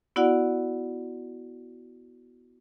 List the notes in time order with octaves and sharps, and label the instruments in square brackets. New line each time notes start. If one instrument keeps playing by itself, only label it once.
[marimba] B3 E4 F#4 D5 F#5